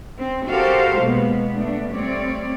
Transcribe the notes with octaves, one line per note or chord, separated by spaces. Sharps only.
C4
F#4 G4 A4 A#4 C5 F5
B2 G#3 A#3 B3
A3 B3 D4
G3 A3 C4 C#5 D5